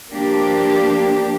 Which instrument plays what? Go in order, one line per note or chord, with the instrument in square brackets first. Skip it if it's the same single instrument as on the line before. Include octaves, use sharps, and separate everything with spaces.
[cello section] F3 A#3 D4 G4